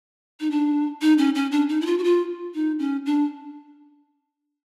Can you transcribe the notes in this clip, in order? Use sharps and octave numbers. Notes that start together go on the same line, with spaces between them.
D#4
D4
D#4
C#4
C#4
D4
D#4
E4
F4
F#4
F4
D#4
C#4
D4